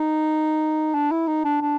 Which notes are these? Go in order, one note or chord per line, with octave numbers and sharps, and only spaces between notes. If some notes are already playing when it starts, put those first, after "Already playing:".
Already playing: D#4
D4
E4
D#4
D4
D4